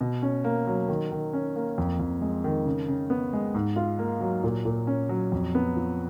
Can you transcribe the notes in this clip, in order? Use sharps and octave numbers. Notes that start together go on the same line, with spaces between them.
B2
C#4
A#3
F#3
D#3
D#3
C#4
A#3
F2
F2
G#3
D#3
C#3
C#3
B3
G#3
G#2
F4
A#3
F#3
A#2
A#2
C#4
F#3
F2
B3
F3